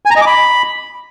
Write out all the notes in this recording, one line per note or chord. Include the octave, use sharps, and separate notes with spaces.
G#5
A#5
D#5
D6
B5